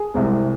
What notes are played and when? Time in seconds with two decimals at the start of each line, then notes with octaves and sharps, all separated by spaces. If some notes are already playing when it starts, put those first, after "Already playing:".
Already playing: G#4
0.14 C2 C3 G#3